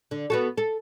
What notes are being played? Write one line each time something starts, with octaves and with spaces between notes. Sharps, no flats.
D3
B3 F#4 A4
A4